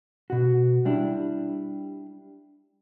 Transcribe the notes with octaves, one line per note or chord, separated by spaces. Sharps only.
B2 F#4
G3 D4 E4